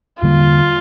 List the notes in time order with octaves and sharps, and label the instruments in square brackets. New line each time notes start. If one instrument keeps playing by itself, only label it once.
[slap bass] E2 D3 G3 A#3 [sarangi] F4